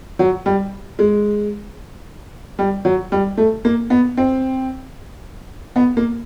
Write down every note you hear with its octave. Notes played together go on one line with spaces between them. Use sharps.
F#3
G3
G#3
G3
F#3
G3
A3
A#3
B3
C4
B3
A#3